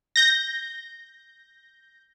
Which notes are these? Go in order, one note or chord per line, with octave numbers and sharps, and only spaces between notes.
G6 A#6